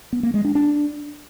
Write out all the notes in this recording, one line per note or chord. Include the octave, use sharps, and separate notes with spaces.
B3
A#3
G#3
D4
D4